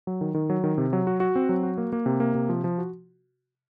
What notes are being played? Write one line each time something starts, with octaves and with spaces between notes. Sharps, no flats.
F#3
D#3
D#3
F#3
D#3
C3
F#3
F#4
F#4
C4
F#3
F#4
A#3
A#3
C3
A#3
C3
F3
F3
F#4